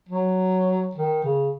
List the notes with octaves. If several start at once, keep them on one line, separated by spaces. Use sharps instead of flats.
F#3
D#3
C#3